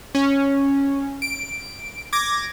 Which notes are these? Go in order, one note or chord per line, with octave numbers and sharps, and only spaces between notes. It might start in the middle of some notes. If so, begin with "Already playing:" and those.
C#4
D7
D6 G#6 A#6